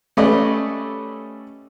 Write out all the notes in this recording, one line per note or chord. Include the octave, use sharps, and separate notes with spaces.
G3 A3 C#4 B4 D5 D#5